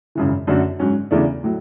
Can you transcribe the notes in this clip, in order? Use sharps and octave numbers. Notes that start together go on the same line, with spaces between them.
G#1 F#2 C#3 E3
F#2 D3 A3 D4 F#4
G#2 F#3 C#4
E2 C#3 E3 A3 D4
A2 F#3